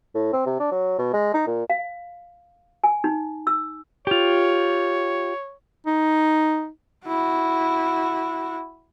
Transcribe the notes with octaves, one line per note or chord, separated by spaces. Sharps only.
A2
C4
C3
D4
F#3
B2
G#3
D#4
A#2
F5
G#5
D#4
E6
F4 G4 C#5
D#4
E4 F#4